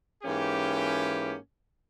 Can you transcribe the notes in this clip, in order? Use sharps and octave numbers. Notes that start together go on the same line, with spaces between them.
G#2 E3 A#3 C#4 G4